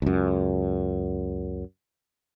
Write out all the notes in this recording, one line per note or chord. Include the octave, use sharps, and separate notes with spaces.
C#2 F#2